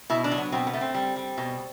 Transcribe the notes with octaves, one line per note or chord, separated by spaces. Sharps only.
B2 E4
D4
F#3
B3
B2 C4
B3
A3
C4
G3
G3
B2